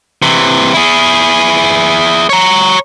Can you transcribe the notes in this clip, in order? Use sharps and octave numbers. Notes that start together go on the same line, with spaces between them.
C3 E3
E4 G#4
C#5 A#5